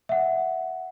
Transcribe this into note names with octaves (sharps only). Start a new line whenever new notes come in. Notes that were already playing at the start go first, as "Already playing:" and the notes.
E5 F#5